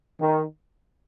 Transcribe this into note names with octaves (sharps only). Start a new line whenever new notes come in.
D#3